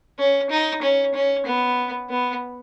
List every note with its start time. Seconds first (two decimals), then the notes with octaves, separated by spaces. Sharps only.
0.19 C#4
0.50 D#4
0.82 C#4
1.14 C#4
1.46 B3
2.10 B3